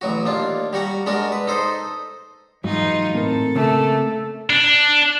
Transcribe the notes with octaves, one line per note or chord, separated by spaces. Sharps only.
A1 F#3 F#4
D#2 D4 F4
G3 F#4 F#5 A#5
G#3 D4 F#4 A#4
B4
D#4 A4 C5 D#5
G#2 E3 F#3 D#4 F4
A2 C4 A4 A#4
C#3 A3 A#3 C#4
D4